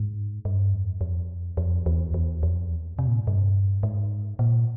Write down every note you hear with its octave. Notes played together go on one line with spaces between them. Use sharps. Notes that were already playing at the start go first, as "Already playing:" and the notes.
Already playing: G#2
G2
F2
F2
F2
E2
E2
F2
E2
C3
A#2
G#2
G2
G#2
A#2